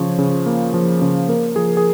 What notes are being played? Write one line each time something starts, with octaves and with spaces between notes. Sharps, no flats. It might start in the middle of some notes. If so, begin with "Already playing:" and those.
Already playing: C#3 F3 C#5
C#3
A#3
F3
C#3
A#3 A#4
F3 G#4
G#4